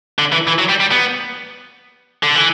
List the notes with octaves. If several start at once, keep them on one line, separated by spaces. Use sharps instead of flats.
D3
E3
E3
F#3
G3
G3
B3
D3
E3